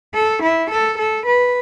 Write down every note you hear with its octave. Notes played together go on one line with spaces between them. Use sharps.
A4
E4
A4
A4
B4